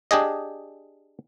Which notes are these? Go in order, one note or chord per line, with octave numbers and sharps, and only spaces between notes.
D4 G4 G#4 D#5